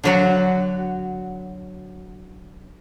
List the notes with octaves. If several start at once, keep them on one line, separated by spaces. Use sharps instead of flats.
D3 F#3 F#4